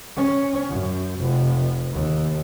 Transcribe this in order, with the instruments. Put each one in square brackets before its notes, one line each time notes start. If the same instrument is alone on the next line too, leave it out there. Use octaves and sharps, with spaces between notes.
[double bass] C#4
F#2
F1
D#2